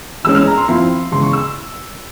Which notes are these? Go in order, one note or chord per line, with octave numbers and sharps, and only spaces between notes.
E3 G#3 C#4 E6
F6
A#5
C6
F3 C4 E4 C6
C#3 E3 G#3 C6
C#6
E6